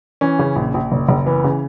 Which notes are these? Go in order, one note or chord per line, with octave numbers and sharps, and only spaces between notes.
E3 C#4
C#3
A#1
A#1
F#1
F#1
E3 B3
C#3